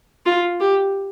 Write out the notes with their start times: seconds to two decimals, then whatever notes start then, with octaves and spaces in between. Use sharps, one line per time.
0.26 F4
0.60 G4